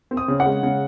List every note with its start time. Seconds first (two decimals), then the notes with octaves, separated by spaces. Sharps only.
0.11 C4
0.17 D#6
0.28 C#3
0.40 F#5
0.46 G#3
0.63 C#3